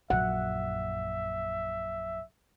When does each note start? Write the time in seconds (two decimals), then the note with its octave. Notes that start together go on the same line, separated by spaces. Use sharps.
0.10 A#1 F#2 E5 F#5